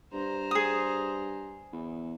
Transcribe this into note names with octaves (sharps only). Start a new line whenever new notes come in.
G2 C5 A#5
G#4 D#6
E2